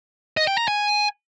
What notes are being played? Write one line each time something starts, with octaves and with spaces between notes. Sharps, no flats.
D#5
G5
A#5
G#5